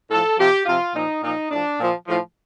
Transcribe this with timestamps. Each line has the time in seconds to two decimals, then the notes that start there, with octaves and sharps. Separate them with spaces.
0.09 A2 F3 A4
0.37 C3 F3 G4
0.65 C3 F3 F4
0.94 A#2 F3 D#4
1.22 A#2 F3 D#4
1.50 A2 F3 D4
1.78 A#2 F3
2.06 A2 F3